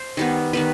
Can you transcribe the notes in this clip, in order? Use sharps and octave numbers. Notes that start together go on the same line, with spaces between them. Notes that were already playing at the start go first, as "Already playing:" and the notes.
Already playing: C5
D#3 G3 B3
D#3 G3 B3 B4